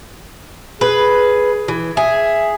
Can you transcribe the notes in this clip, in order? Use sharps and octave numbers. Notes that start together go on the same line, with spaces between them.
G#4 B4
E3
G#4 E5